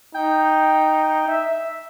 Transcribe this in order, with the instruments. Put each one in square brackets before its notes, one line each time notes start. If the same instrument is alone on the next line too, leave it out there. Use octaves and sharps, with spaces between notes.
[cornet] D#4 [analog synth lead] G5
[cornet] E5